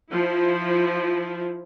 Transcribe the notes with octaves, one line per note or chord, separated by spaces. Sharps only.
F3 E4